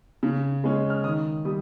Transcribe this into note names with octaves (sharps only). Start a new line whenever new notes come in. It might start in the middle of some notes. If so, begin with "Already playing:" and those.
C#3
G#3 C#4
F6
D#3 D#6
G3 D#6